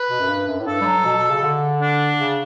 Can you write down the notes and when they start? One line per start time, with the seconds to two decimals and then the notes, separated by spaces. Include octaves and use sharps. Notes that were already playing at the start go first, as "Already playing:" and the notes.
Already playing: B4
0.10 B2
0.20 F#2
0.28 G2
0.47 F#2
0.60 A2
0.67 G2 A4
0.81 G3
0.85 F#3
1.05 B2
1.17 B2
1.30 C#3
1.43 D3
1.82 D4
2.19 C#3